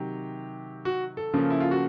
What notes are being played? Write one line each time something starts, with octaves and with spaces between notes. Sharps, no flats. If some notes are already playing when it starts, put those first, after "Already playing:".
Already playing: C3 D#3 F#3 G4
F#4
A4
C#3 F3 A#3 C#4
E4
F4
F#4